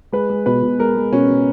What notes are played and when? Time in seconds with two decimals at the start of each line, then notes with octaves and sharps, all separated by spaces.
0.12 G#3 B4
0.29 G#3
0.46 B2 B4
0.63 B2
0.79 G#3 A#4
0.96 G#3
1.12 B2 C#4
1.29 B2